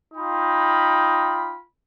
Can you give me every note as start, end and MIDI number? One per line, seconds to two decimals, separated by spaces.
0.14 1.57 63
0.14 1.57 65
0.14 1.57 79
0.14 1.57 83